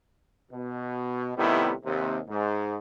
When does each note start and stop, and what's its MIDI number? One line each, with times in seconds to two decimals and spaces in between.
0.52 1.32 47
1.37 1.73 45
1.37 1.73 48
1.37 1.73 51
1.37 1.73 55
1.37 1.73 59
1.37 1.73 64
1.85 2.20 39
1.85 2.20 48
2.29 2.78 44